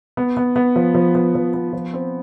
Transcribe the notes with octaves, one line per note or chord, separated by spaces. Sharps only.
B3
B3
B3
F3
F3
B3
F3
B3
F3
C4